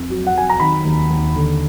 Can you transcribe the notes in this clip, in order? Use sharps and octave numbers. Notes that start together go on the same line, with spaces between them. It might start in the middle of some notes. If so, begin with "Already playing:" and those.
Already playing: F2
F#3
F#5
F#3 G#5
A#5
D#3 B5
D#2
D#2
D3